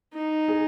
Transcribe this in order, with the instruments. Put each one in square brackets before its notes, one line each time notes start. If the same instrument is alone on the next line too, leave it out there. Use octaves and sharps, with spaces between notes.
[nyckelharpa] D#4
[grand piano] G#4